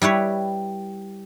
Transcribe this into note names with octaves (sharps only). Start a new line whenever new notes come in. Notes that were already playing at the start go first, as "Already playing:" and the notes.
G3 E4 B4 C#5